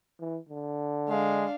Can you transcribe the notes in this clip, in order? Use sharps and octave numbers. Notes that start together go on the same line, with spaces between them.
E3
D3
G#3 D4 F5